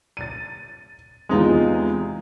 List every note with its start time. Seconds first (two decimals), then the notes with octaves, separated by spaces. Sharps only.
0.17 A6 D#7
1.29 E2 C3 G#3 D#4 F4